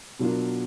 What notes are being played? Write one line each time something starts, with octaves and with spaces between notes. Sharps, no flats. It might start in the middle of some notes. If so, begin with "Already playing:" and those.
B2 F#3 D4 F4 A#4